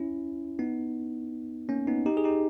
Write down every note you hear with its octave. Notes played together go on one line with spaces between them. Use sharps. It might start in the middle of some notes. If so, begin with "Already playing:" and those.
Already playing: C#4 E4
B3 D#4
A#3 C#4
B3 D#4
D#4 G4
G#4
D#4 G4